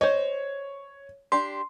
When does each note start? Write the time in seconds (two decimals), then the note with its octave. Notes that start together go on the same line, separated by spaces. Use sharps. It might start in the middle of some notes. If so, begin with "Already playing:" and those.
0.01 C5 C#5 D#5
1.32 D4 G4 C6